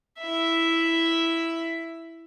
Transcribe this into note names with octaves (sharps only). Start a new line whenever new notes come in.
E4 E5